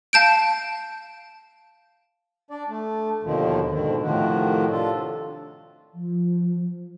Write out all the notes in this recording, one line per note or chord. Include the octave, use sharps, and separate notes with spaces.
F5 A5 G6 D7
D4 D5
A3
D#2 B2 D3 D#3 F3
G#2 B2 D3 D#3
A2 C3 D#3 F3 F#4
D4 F4 A4
F3